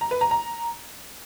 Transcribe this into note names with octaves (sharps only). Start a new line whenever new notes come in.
A#5
B4
A#5
A#5